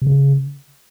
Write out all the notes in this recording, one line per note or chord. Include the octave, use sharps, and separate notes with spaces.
C3
C#3